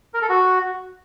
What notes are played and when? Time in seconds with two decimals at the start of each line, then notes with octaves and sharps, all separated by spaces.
0.14 A#4
0.22 A4
0.29 F#4